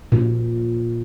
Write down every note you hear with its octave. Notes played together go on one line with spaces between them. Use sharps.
A#2